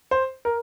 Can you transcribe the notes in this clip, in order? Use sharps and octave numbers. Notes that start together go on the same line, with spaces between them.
C5
A#4